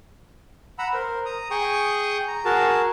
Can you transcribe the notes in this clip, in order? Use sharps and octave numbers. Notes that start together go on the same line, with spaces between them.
F#5 A#5 B5 E6
A#4 C5
A#5 D#6
G#4 G5 C#6 D#6
A#5
F#4 G#4 A#4 A5